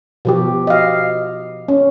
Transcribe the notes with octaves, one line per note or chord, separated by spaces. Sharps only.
B2 F3 G4
D#5 F5
C#4